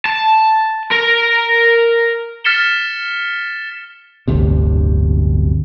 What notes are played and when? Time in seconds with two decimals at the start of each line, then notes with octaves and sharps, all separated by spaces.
0.06 A5
0.92 A#4
2.44 F6 A6 B6 C#7 E7 G7
4.28 D1 G1 D2 C3